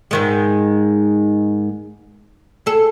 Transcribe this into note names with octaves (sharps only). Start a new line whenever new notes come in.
G#2 D#3 G#3
G#4 A4